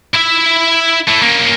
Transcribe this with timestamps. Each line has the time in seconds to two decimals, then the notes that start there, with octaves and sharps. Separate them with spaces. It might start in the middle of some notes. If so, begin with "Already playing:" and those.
0.15 E4 E5
1.08 A3 E4
1.22 A#3 C#4